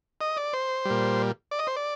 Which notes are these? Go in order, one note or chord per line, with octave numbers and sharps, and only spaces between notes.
D#5
D5
C5
A#2 G3
D5
D#5
C5
D5